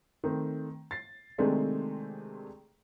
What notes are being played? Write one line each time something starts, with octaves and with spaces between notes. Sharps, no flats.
D#3 A3 C4
A6 C7
C3 D#3 G#3 A3 C4 D4